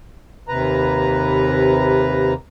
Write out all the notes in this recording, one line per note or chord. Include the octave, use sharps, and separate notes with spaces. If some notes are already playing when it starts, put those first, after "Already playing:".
D#2 C3 B4 A#5